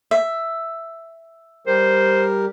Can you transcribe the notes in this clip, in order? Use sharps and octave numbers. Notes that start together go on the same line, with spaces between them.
E5
G3 G4 A#4 C5